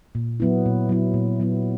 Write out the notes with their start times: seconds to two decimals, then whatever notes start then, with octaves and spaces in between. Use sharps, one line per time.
0.15 A#2
0.40 F#3 B3 E4
0.66 A#2
0.89 F#3 B3 E4
1.14 A#2
1.40 F#3 B3 E4